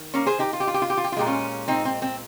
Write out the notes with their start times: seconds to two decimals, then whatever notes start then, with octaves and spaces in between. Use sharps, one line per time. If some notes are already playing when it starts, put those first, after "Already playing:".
Already playing: D#3
0.14 A#3 C#4
0.26 G#4 C5
0.39 D#4 G4
0.53 F4
0.60 G4
0.67 F4
0.74 G4
0.82 F4
0.90 G4
0.97 F4
1.04 G4
1.12 F4
1.17 A#2 G#3 G4
1.26 C#4 F4
1.68 C4 D#4
1.85 C4
2.02 C4